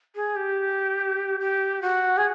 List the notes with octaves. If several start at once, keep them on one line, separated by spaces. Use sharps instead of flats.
G#4
G4
G4
F#4
G#4